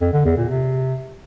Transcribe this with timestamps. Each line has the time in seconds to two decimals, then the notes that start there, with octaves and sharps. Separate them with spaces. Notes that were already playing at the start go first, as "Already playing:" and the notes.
0.01 F2
0.13 D3
0.25 E2
0.37 A#2
0.49 C3